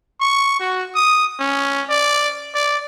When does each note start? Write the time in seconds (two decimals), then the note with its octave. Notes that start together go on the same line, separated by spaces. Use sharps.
0.21 C#6
0.60 F#4
0.95 D#6
1.40 C#4
1.90 D5
2.55 D5